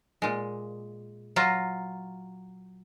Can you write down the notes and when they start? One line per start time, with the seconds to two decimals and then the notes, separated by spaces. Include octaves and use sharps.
0.22 A#2 G#3
1.36 F#3 F4 A#5